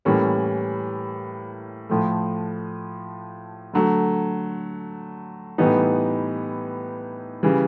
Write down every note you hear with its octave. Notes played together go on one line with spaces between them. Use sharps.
A2 E3 G3 A#3 C#4
A2 F3 A3
D3 F#3 A3
A2 E3 G3 B3 D#4
C#3 E3 G3